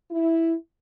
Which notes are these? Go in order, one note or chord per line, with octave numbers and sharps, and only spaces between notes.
E4